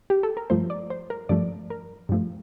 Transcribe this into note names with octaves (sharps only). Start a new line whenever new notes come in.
G4
A4
A#4
G2 F3 A3 C5
D5
C5
A#4
G2 F3 A3 D5
A#4
G2 F3 A3